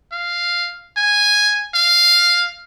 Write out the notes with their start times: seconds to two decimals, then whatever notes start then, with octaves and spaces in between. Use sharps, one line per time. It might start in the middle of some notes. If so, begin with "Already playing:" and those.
0.12 F5
0.97 G#5
1.75 F5